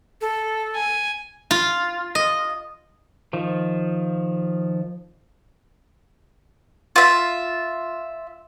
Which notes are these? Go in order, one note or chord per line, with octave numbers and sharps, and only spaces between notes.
A4
G#5
F4
D#5
D#3 F3
F4 E5